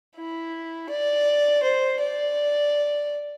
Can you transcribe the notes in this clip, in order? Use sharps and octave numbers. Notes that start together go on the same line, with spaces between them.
E4
D5
C5
D5